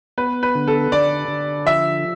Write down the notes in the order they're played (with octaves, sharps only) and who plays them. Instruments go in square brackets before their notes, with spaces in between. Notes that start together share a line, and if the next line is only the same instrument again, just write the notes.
[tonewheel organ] B3 [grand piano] B4
[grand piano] B4
[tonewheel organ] D3
[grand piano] A4
[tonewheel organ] D3 [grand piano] D5
[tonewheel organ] D3
[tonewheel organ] F3 [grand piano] E5